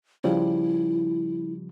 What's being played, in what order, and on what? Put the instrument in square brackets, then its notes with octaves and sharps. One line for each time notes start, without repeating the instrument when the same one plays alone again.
[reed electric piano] C#3 F3 G3 [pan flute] E4